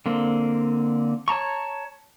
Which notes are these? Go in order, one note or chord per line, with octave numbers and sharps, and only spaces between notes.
D3 A#3 C4
C#5 A5 A#5 C#6